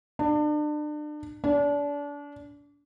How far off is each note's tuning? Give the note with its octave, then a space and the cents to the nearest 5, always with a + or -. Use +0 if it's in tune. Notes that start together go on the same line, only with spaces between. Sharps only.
D4 +35
D4 -30